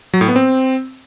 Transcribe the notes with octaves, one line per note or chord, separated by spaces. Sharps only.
F#3
A2
B3
C4